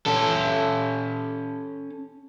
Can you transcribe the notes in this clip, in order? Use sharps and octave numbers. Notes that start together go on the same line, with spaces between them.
C#4 A4